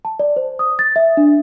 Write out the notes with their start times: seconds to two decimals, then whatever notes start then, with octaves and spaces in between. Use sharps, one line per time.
0.05 A5
0.19 D5
0.36 C5
0.59 D#6
0.79 A6
0.96 E5
1.17 D4